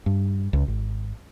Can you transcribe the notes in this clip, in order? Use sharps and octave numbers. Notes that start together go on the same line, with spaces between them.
G2
C#2
G#1